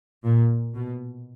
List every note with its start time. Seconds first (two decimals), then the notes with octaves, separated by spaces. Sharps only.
0.24 A#2
0.74 B2